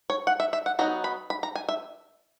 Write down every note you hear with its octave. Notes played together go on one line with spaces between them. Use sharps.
C#5
F#5
E5
E5
F#5
F#3 B3 D#4 A#5
B5
B5
A#5
G#5
E5